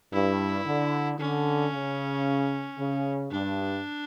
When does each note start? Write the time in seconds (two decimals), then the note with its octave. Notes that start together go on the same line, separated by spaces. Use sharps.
0.13 G2 E4
0.66 D3
1.19 D3 C#4
1.72 C#3
2.78 C#3
3.31 G2 D4